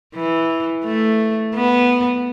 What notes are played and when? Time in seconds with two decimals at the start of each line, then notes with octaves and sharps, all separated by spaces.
0.15 E3
0.85 A3
1.56 B3